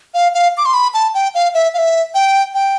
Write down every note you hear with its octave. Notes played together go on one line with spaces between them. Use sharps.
F5
F5
D6
C6
B5
A5
G5
F5
E5
F5
E5
G5
G5